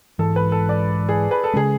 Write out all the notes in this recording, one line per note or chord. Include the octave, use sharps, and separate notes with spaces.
G#2 E3 G#3 A4
B4
A4
D5
G#4
B4
A4
C#3 G#3 C#4 G#4